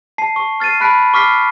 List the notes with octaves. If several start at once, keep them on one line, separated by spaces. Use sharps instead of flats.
A5 C7
C#6
F6 A6 C7 D#7
A5 B5 F#6 B6 D7
C#6 D6 F6 B6 C7